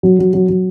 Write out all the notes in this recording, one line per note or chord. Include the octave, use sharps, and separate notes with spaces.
F#3
F#3
F#3
F#3